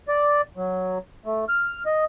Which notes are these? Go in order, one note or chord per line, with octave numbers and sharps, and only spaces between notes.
D5
F#3
A3
F6
D#5